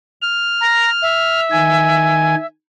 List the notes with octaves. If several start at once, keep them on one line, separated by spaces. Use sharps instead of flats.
F6
A#5
E5
D#3 G#5